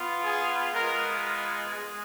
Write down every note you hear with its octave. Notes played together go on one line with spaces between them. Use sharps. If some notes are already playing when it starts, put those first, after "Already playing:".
Already playing: B3 F4
G#4
G#3 B3 F4 A#4
G#3